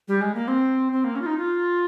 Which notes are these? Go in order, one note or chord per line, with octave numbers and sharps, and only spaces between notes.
G3
G#3
A#3
C4
C4
A#3
C#4
F4
D#4
F4